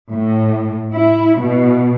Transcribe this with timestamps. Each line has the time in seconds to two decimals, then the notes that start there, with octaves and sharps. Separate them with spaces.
0.11 A2
0.93 E4
1.40 B2